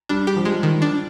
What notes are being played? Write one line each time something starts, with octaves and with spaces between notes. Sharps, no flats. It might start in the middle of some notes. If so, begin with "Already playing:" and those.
G3 D4
G4
F3
G#3
D#3
D4